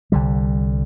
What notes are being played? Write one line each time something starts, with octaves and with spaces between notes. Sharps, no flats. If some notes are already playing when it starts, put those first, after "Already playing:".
C2 D3 G3